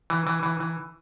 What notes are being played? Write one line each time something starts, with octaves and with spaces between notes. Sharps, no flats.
E3
E3
E3
E3